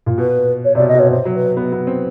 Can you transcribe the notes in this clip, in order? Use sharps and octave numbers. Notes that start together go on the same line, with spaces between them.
A#2
B2 B4
C#5
C3 D5
B2
D#5
B2
C#5
C3 C5
F#3
B4
B3
B3
C4